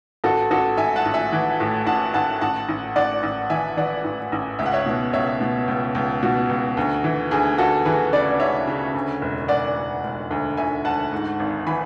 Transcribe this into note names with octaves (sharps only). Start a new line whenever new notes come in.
A1 F#4 A4
A1 F#4 A4
A1 E5 G#5
F#5 A5
A1
E5 G#5
E3
A2
A1 F#5 A5
A1 F#5 A5
A1 F#5 A5
A1
A1 D5 F#5
A1
E3 E5 G#5
E3 D5 F#5
A1
A1
C#2 E5
F#5
C#5 E5
B2
C#2 C#5 E5
B2
C#2
C#2
B2 F#4
C#2
D2
E3
D2 G#4
D2 F#4 A4
E3 G#4 B4
C#3 B4 D5
C#3 C#5 E5
C#3
D2
E1
E1 D5 F#5
E1
E1
D2
D2 E5 G#5
D2 F#5 A5
G#2
G#1
E3 G#5 B5